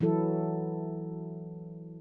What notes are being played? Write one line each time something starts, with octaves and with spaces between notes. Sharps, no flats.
E3 F#3 E4 A4